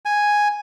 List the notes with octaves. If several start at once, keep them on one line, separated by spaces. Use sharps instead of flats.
G#5